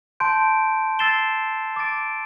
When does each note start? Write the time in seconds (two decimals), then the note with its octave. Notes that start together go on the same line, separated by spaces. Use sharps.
0.20 A5 C6 G6 D7
0.99 E6 A6 C7 E7 G7
1.76 D6 A6 D7